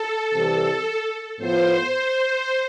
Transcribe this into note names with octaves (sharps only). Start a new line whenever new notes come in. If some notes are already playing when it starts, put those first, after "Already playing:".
Already playing: A4
C3 E3 G3
A2 F3 B3 F4 C5